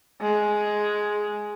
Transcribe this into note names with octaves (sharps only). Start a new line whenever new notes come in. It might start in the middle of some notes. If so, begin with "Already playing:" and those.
G#3